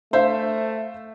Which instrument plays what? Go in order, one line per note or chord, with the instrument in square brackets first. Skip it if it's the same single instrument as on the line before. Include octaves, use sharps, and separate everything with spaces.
[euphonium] A3 [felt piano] C5 E5 F5